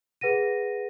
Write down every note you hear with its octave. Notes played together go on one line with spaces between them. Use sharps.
G#4 B4 F#5 A#6 D#7